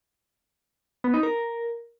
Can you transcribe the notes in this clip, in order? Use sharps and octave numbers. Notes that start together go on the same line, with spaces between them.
B3
D#4
A#4